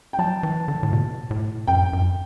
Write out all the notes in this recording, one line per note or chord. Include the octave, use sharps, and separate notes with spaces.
G5
F#3 A5
E3
D3
A2
B2
A2
F#2 G5
F#2